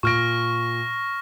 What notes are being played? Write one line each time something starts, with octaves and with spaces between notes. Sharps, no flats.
A#2 C#6 F6 A#6 D7